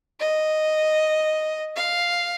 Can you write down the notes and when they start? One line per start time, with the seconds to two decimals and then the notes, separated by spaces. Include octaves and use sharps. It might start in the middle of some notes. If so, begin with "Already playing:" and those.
0.20 D#5
1.76 F5